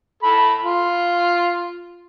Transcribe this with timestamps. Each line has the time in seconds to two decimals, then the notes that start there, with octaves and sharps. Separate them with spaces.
0.23 A4 B5
0.63 F4